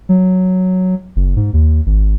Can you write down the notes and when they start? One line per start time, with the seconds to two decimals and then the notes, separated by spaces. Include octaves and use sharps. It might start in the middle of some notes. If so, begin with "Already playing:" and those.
0.09 F#3
1.16 F#1
1.36 G#2
1.53 D#2
1.86 G#1